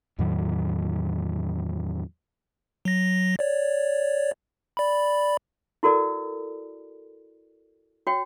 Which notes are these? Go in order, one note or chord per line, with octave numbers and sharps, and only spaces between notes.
E2 A2 D#3 F#3
F#3 A#6
C#5 D5
D5 B5
E4 F#4 A4 A#4 D5
F#4 C#5 G5